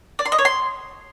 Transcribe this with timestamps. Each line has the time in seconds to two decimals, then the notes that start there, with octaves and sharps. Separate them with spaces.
0.19 D5
0.25 C6
0.32 D#5
0.38 C#5
0.45 C6